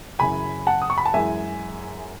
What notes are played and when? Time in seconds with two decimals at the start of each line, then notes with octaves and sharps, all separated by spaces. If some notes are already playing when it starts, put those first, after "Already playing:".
0.19 F#2 C#3 E3 G#5 B5
0.67 F#5 A5
0.82 D#6
0.90 C#6
0.98 B5
1.05 A5
1.14 F#2 E3 G#3 E5 G#5